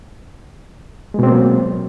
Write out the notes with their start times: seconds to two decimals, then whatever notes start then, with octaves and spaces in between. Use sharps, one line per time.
1.14 G#3
1.19 B2
1.23 C4
1.28 A#3
1.32 F#3